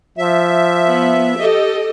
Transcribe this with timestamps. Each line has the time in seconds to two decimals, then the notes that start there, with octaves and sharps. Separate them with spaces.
0.18 F3 E5
0.84 B3
1.40 G4 A4 D#5